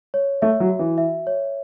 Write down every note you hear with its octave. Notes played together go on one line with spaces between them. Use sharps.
C#5
A3 E5
F#3
F#4
E3
E5
C#5